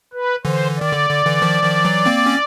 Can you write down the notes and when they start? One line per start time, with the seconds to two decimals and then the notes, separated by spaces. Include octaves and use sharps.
0.13 B4
0.45 D3 E3 C5
0.78 D#3 D5
0.93 D3
1.10 D3
1.26 D3 E3
1.42 D#3 F3
1.63 D#3 F3
1.85 E3 F#3
2.06 A#3 C4
2.26 C#4